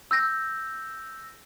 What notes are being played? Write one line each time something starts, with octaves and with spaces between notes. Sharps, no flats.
E6 G6 A#6